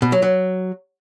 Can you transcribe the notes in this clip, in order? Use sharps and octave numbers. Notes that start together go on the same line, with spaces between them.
B2
F#3
F#3